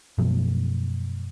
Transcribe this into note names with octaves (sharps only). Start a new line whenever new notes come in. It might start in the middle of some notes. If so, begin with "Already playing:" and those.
F#2 B2 F3 A3